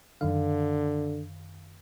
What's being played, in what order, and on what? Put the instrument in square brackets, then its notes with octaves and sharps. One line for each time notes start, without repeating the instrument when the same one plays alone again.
[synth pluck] F#2 D#3 F5 [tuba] D3